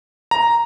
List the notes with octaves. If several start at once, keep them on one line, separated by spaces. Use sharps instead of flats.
A#5